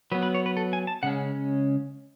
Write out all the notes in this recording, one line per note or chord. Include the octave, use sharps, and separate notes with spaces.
F#3 B3 B4
B4
C#5
B4
A4
G#5
A5
C#3 G#3 C#4 F#5